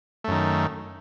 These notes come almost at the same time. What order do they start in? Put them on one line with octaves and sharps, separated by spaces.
A3 F#2 D#3